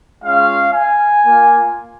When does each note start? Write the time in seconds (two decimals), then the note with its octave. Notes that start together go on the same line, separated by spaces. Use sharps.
0.23 G#3 C#4 F4 F5
0.74 G#5
1.25 A#3 F4